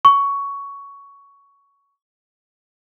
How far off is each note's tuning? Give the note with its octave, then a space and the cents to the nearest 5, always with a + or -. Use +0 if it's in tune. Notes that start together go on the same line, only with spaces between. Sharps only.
C#6 +15